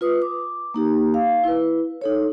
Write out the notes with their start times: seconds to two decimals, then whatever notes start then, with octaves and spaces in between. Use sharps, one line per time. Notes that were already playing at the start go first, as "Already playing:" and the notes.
0.01 F4 B4 D#6
0.22 D6
0.74 A#3 D#4 G4
1.14 F5
1.44 E4 B4
2.01 D#4 A4 C#5